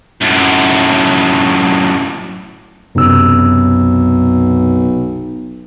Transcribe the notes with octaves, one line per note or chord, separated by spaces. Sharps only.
F#2 A2
B1 F#2 C3 E6